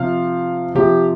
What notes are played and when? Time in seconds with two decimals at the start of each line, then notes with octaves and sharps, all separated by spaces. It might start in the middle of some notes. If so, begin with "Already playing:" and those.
Already playing: C3 F3 F5
0.75 C3 F3 G4